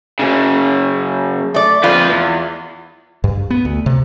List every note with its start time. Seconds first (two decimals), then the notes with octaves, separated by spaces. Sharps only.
0.19 F#2 C#3
1.54 A3 D5
1.84 F2 F4 B4
2.09 E2
3.24 G2
3.50 B3
3.65 D2
3.86 C3